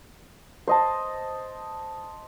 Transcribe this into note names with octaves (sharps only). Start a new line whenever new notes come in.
C5 D#5 A5